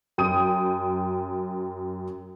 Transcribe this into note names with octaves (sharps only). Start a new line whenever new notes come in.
F#2 G5 D#6 D#7